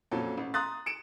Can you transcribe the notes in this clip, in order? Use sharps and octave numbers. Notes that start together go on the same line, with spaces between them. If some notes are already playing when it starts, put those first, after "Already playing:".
F2 A#2 F#3 C#4 A4
A1
A#5 C6 D#6 F#6 A6
C#7 D7 E7